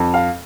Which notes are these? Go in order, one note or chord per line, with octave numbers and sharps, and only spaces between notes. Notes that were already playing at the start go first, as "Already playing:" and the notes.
Already playing: F2
F5